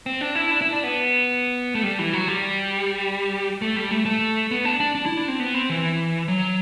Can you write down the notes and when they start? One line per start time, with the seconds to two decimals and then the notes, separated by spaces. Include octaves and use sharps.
0.06 C4
0.21 D4
0.35 E4
0.51 D4
0.62 E4
0.73 D4
0.84 B3
1.75 A3
1.83 G3
1.99 E3
2.13 F#3
2.28 G3
3.62 A3
3.76 G3
3.91 A3
4.06 A3
4.51 B3
4.65 D4
4.80 D4
4.95 D4
5.06 E4
5.17 D4
5.28 C4
5.40 B3
5.54 C4
5.70 E3
6.28 F#3